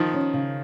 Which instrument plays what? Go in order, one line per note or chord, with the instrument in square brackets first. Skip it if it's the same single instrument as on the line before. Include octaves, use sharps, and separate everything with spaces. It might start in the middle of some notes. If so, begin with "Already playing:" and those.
Already playing: [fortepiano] D#3 F3
[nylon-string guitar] C#4
C#3